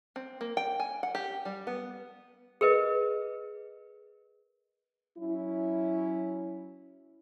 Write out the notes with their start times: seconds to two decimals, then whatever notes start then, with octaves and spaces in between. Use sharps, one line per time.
0.16 C4
0.41 A#3
0.57 G5
0.80 G#5
1.03 F#5
1.15 G4
1.45 G3
1.67 B3
2.61 G#4 A#4 B4 D#5
5.17 F#3 C#4 E4